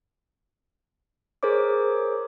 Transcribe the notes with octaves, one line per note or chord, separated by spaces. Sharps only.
G#4 A#4 C5 C#5 D6